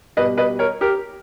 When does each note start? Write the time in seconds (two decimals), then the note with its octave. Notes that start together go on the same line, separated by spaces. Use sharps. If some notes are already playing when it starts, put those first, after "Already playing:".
0.17 B2 G3 B4 D#5
0.38 B4 D#5
0.59 A#4 C#5
0.81 G4 A#4